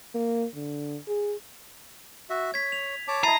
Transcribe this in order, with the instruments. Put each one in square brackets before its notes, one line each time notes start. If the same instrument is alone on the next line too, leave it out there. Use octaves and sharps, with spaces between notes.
[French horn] A#3
D3
G#4
[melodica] F#4 E5
[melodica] C#5 [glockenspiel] G#6 B6
[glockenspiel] F7
[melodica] C#5 A5 D6
[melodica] E4 [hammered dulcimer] D#5 A5 [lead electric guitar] A#5 [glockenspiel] C7 D#7